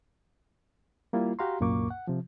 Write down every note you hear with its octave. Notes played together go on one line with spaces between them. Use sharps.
G3 A#3 E4 F4
F#4 G4 F5 A#5 C6
C2 F#2 A#2 A#3 C#6 D6
F#5
C3 F3